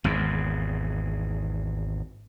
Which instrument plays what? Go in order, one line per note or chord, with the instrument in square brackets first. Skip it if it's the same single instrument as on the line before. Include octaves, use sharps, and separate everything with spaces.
[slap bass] G#1 E2